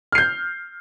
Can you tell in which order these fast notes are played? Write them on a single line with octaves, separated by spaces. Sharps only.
F6 C7 G6